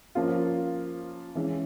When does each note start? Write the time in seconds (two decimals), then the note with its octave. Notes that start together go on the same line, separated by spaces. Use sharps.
0.15 F3 A#3 C#4 F4
1.35 E3 G#3 C#4